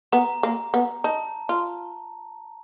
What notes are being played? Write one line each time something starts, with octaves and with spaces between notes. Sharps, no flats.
B3 A#5
A#3
B3
D#4 A5
F4